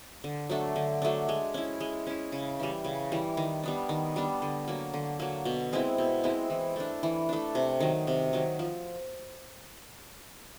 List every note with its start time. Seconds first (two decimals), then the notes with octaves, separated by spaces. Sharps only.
0.24 D3
0.50 F#3 A3 D4
0.76 D3
1.02 F#3 A3 D4
1.29 G#3
1.54 C#4 E4
1.81 G#3
2.07 C#4 E4
2.32 C#3
2.60 E3 G3
2.85 C#3
3.12 E3 G3
3.37 D#3
3.63 G3 B3 D4
3.89 D#3
4.16 G3 B3 D4
4.42 D3
4.68 F#3 A#3
4.94 D3
5.19 F#3 A#3
5.45 B2
5.73 G#3 C4 E4
5.98 B2
6.24 G#3 C4 E4
6.50 E3
6.76 A3 D4
7.03 E3
7.29 A3 D4
7.55 C3
7.80 D#3 F#3
8.07 C3
8.33 D#3 F#3
8.59 F3